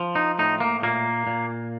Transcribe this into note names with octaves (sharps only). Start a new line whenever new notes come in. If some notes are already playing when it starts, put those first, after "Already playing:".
Already playing: F3
D#4
A2 D#4
A#3
A#2 A#3
A#2